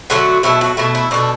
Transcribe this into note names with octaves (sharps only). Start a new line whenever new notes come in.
D3 F#3 A3 F#4
B2 F#3 A3 E4
F#4
B2 A3 E4
E4
B2 A3 D4